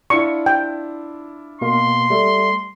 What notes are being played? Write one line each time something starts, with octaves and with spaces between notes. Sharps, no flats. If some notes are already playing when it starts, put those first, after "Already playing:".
D4 E4 F4 C#6
G5
B2 A#3 C6
G3 A3